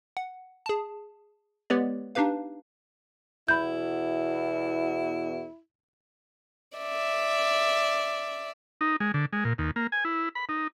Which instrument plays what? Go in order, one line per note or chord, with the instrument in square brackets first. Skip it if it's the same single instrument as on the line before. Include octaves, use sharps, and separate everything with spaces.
[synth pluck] F#5
G#4 A5
G#3 B3 G4 B4 C#5 D5
D4 D#4 G4 B4 F5
[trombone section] E2 B2 F#4 [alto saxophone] E4 [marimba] B5 G6
[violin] D5 E5
[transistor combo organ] D#4
G#3
D3
G#3
A#2
D#2
A#3
G#5
E4
B5
D#4